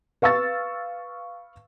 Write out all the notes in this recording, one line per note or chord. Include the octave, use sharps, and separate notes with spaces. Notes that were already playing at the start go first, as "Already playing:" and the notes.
B4 F5 C#6 E6 A6